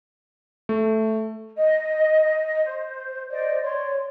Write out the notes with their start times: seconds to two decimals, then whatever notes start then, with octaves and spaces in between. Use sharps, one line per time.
0.69 A3
1.57 D#5
2.64 C5
3.29 C5 D5 D#5
3.62 C#5 D5 C6